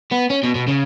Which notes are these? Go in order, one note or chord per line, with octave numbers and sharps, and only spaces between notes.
B3
C#4
B2
B2
C#3